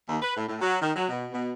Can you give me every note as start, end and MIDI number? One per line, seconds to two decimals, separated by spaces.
0.08 0.18 39
0.22 0.34 71
0.36 0.44 45
0.48 0.56 45
0.61 0.75 54
0.81 0.90 51
0.95 1.06 54
1.09 1.26 47
1.32 1.52 47